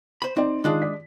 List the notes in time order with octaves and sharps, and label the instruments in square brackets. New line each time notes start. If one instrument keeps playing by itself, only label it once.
[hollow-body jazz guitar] C5 B5
[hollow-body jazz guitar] C4 [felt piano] D#4 D5
[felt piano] D#3 F4 [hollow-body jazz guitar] G#3 D4 G#4
[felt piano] D5 B6